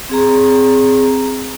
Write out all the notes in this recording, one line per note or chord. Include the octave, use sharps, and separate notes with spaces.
C4 G#4 A#5